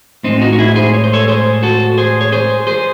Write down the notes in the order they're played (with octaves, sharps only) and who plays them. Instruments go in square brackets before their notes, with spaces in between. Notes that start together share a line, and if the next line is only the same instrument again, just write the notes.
[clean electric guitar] A2 G#3 C4 D#4
D#4 F#4
F#4
E4 G#4
G#4 C5
C#5
C5
A4 C#5
G#4 C5
F#4 A4
G#4 C5
C#5
G#4 C5
G#4 C5